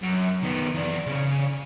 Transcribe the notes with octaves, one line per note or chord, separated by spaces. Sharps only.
F#2
D#3 B3
E3 D5
C#3 C#4